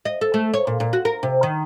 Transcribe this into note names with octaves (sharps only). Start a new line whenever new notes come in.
D#5
A4
A3
C#5
A#2
A#2
F#4
A#4
C3
D#3